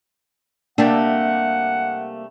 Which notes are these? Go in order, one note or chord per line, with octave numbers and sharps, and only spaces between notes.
C3 G3 A3 A#3 D4 F#5 G5 A5